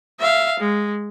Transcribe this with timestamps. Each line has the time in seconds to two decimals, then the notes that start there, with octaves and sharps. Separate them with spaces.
0.20 E5 F5
0.60 G#3